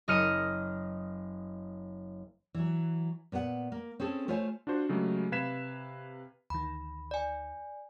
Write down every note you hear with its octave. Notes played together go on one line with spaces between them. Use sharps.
F#1 D#5 F6 C#7 D#7
E3 F#3
A#2 B3 A#4 F#5
A#3
C4 C#4 G#4 A4
A3 F4 C5 C#5 G5 G#5
D4 F4 F#4 C5
C#3 F#3 G#3 A3 G4
C3 B4 F5 G#6 B6 E7
D2 D#3 B5
D5 G#5